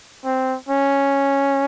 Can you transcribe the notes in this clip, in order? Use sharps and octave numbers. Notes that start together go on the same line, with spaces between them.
C4
C#4